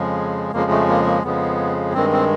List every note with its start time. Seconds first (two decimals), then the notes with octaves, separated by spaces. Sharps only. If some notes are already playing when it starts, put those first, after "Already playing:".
Already playing: F2 C#3 F3 G#3
0.53 F2 C#3 F3 G#3 A#3
0.71 A3
0.89 A#3
1.06 A#3
1.24 F2 C#3 F3 G#3 B3
1.94 G2 D#3 G#3 C4
2.12 C4